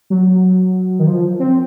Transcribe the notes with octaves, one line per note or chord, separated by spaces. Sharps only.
F#3
D#3
F3
C4